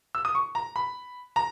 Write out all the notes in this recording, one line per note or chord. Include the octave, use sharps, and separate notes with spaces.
E6
D#6
C#6
A#5
B5
A#5